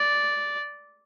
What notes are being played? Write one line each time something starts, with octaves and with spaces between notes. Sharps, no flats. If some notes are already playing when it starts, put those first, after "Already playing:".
Already playing: D5